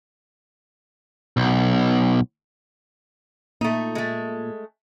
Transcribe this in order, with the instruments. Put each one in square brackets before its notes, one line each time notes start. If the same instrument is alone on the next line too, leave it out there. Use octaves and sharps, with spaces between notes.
[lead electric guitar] B1
[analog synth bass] A#2 [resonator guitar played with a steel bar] A3 D#4
[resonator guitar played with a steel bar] G#3 A3